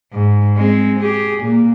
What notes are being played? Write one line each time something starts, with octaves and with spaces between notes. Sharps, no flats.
G#2
G#3 C4
G4 G#4
A#2 A#3